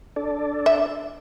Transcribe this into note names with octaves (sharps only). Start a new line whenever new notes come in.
D4 A4 D5
E5